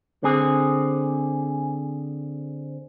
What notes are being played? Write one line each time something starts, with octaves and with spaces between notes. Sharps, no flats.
D3 C4 G#4